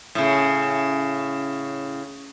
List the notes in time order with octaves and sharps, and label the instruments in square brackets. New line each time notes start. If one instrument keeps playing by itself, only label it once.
[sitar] A2 C#3